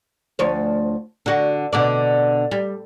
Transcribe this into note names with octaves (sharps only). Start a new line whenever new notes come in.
D2 F3 C#5
D3 F#4
B2 D3 D5
G3